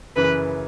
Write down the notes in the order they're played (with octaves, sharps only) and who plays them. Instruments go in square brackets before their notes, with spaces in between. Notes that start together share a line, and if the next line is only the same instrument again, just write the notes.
[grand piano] F#2 C#3 E3 [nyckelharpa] B4